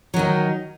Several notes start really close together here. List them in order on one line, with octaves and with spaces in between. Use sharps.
F#3 D#3 D#4